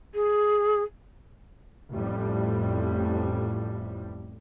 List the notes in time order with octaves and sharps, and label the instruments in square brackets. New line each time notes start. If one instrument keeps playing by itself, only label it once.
[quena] G#4
[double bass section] A1 F2 A2 G3